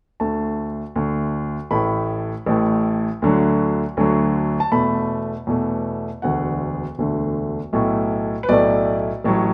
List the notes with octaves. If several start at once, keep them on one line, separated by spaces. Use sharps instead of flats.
D2 D3 A3 A5
D2 D3 A3
A1 A2 A3 B5
A1 A2 A3
D2 D3 F#3 A3
D2 D3 F#3 A3
A5
E2 B2 A3 B5
E2 B2 A3
E1 D2 D3 A3 F#5
E1 D2 D3 A3
B1 A2 A3
B4
B1 A2 A3 D5
A1 A2 F#3